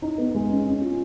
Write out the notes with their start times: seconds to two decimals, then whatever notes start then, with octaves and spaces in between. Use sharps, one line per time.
0.02 D#4
0.18 B3
0.35 G#3
0.49 C#4
0.66 C#4
0.81 F4